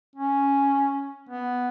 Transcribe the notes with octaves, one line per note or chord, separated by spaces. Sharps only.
C#4
B3